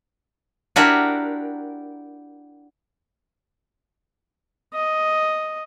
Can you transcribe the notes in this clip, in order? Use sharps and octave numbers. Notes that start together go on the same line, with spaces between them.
D4 E4 F#4 G4 A#4
D#5